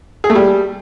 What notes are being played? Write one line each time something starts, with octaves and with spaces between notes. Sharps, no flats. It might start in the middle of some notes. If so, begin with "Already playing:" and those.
G#4
A3
G3